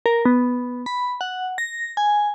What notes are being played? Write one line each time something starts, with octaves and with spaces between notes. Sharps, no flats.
A#4
B3
B5
F#5
A#6
G#5